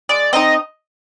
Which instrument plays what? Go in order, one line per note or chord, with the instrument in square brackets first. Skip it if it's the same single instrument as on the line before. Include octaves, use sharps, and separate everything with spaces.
[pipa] G#3 [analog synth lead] D5
[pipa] C4 D#4 [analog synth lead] D#5